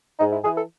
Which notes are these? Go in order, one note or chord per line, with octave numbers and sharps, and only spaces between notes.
G#2 D#4
E4
E3 G#4
A4